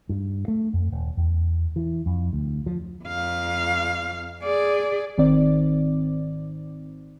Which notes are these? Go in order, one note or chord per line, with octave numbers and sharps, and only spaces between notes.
G2
A3
F2
D#1
E2
E3
F2
D2
F3
F2 F5
G#4 D5
G#1 D#3 C4 D5